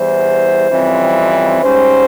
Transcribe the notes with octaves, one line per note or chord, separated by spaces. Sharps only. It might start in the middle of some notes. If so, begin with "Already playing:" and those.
Already playing: E2 E3 G3 C5
F2 C#3 E3 G3 C4
G#2 G3 C#4 C5